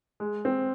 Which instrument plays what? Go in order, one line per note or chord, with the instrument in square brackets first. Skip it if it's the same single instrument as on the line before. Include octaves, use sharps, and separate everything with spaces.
[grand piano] G#3
C4